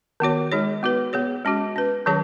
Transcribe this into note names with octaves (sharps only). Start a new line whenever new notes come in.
D#3 B3 F#4 C#5
G#3 D#4 G#4 C#5
B3 F#4 B4
B3 G#4 C#5
G#3 C#4 F#4
C#4 B4
D#3 F#3 C#4 G#4 C#5